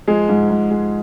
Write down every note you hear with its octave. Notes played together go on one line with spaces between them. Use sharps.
F3 G#3 G#4
G#2
G#2
G#3